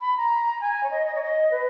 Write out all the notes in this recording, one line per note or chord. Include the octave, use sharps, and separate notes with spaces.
B5
A#5
G#5
C#5
D#5
D#5
C#5
D#5
B4